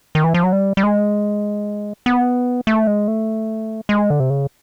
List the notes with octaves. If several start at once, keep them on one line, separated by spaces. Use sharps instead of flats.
D#3
E3
F3
F#3
G3
G3
G#3
B3
A3
G#3
A3
G#3
D3
C3
C#3